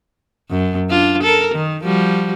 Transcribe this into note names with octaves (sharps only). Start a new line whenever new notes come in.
F#2
D4 F4
A4 A#4
D#3
F3 G3 F#4